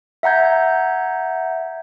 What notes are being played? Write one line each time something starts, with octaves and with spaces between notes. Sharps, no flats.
E5 F#5 A#5 G6 G#6